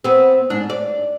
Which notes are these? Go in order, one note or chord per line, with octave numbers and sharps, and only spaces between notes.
B3 C4
G#2 D4
D5